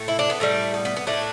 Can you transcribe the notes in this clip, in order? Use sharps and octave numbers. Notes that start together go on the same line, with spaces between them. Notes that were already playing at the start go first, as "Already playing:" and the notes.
Already playing: A2 A3
E4
D4
B3
A2 G3 A3
B3
B3
B3
A2 A3 D4